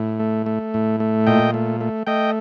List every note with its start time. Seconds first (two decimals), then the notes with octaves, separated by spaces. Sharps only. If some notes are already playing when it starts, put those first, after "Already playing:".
Already playing: A2
0.20 A3
0.46 A3
0.74 A2
1.00 A3
1.27 A#2 D#5 G5
1.54 A3
1.81 A3
2.07 A3 D#5 G5